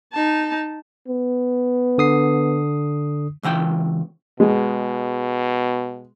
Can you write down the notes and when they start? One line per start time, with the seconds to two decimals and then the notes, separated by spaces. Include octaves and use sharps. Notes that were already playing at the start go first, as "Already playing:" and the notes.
0.13 D#4 A5
1.08 B3
1.98 D3 D#6 C7
3.43 C#2 E3 F#5 G5
4.40 B2 G#3